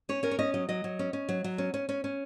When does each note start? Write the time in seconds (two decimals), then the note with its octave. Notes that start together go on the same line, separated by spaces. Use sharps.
0.09 C#4 C#5
0.23 C#4 A#4
0.31 C#5
0.39 C#4 D#5
0.54 F#3 D#5
0.69 F#3 D#5
0.84 F#3
0.99 C#4
1.13 C#4
1.29 F#3
1.44 F#3
1.58 C#4
1.74 C#4
1.89 C#4
2.04 C#4